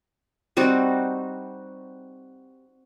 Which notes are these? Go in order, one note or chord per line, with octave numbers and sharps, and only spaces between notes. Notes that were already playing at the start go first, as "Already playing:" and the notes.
G3 C4 D#4 F#4